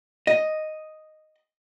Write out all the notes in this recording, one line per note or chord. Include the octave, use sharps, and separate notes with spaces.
D#5